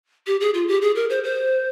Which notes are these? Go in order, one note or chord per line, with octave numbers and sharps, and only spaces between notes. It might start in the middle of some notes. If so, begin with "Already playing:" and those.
G4
G#4
F4
G4
G#4
A#4
C5
C5